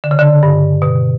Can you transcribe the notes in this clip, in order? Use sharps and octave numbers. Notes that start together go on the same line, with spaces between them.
D3
C#3
D3
G2
B2